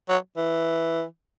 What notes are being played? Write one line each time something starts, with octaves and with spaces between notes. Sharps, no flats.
F#3
E3